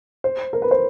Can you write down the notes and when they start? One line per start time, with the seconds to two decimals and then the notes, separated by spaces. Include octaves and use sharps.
0.24 C5
0.53 A#4
0.62 B4
0.71 C5